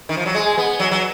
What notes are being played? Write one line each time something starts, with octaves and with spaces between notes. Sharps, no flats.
D#3
F3
F#3
G#3
B3
F#3
F#3